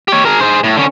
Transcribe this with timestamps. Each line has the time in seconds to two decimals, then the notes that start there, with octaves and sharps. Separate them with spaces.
0.08 G4 C#5
0.25 G#4 A#4
0.41 G#4 C5
0.64 A2
0.77 D3 C#4